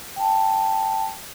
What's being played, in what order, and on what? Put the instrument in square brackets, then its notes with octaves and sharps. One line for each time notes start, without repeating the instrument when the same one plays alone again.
[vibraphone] G5 A5